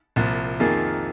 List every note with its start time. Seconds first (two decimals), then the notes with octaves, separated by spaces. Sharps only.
0.16 C2 A#2 F3
0.60 F2 D#3 A#3 F4 G#4